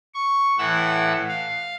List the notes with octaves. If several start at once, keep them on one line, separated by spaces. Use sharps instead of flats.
C#6
A2 E3 F#5 E6
F5